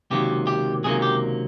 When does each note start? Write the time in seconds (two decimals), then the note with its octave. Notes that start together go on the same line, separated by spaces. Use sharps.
0.10 C#2 C3 D#3 F#3 A#3 G4
0.47 G4
0.84 C#2 C3 D#3 F#3 A#3 G#4
1.02 G4